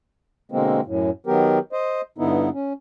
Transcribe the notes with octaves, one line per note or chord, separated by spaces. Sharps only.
B2 D3 G#3 A#3 C4
F#2 A2
D#3 F#3 B3 G4 A#4
C5 D#5
G2 D3 B3 D#4 E4
C#4